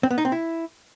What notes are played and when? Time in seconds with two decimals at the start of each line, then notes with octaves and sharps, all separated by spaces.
0.03 C4
0.11 B3
0.18 D#4
0.25 C4
0.32 E4